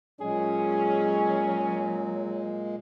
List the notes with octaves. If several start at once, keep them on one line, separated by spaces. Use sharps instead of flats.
A#2 F#3 G#3 C#4 G#4